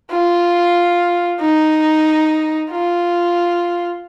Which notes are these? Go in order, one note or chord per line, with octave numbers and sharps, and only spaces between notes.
F4
D#4
F4